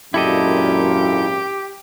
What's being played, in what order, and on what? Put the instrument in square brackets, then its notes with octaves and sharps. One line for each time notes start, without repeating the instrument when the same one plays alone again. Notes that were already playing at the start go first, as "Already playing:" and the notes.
[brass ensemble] G#1 F#2 A#2 [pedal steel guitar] E4 A4 D#5 [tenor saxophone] G4